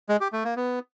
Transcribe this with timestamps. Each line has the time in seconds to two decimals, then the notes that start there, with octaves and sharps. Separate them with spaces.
0.09 G#3
0.21 G4
0.33 A3
0.44 A#3
0.56 B3